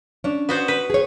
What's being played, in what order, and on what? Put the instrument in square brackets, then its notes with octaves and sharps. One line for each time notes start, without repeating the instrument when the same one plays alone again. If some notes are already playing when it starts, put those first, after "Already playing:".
[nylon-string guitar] C#4 D4
[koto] B3 F#4 C5
B4
[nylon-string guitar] G#4 C#5